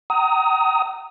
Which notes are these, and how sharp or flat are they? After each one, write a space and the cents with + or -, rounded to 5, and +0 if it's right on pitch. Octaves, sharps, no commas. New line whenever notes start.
G5 -45 A#5 -15 D#6 +20